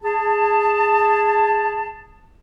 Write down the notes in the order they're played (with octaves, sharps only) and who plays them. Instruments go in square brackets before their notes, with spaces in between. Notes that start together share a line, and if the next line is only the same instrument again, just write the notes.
[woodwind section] G#4 A5